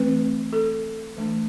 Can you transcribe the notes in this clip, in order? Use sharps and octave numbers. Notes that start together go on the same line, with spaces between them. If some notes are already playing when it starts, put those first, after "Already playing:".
Already playing: E3 A3 C4 B4
A4
E3 A3 D4